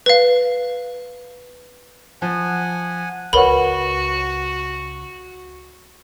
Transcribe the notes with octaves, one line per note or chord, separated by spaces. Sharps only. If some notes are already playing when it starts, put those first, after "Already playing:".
B4 F5
F3 F#5 G#5
C#2 F#4 A#4 B4 C#5 F#5 B5